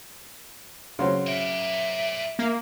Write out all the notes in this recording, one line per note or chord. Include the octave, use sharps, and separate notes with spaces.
C#3 F#3 C4 C6
A#4 D5 E5
A#3